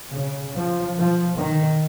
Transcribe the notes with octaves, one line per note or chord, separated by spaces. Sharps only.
C#3
F3
F3
D#3